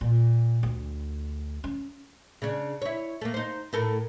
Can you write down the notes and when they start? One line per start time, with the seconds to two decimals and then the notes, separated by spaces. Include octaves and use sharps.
0.01 A#2
0.63 D2
1.64 C#4
2.42 C#3 D4
2.82 E4 C#5
3.21 A3 A#3
3.34 D#4 C5
3.73 A2 A4 A#4